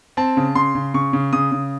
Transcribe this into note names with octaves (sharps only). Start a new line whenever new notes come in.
C4 A5
C#3
C#3 C6
C#3
C#3 C#6
C#3
C#3 D#6
C#3